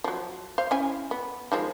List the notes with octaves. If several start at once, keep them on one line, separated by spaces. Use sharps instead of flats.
F3 F#3
C5 F5
C#4 E4 G#5
B3
D#3 F3 G#3